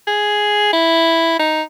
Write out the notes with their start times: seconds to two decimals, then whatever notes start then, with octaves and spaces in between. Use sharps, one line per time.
0.07 G#4
0.73 E4
1.39 D#4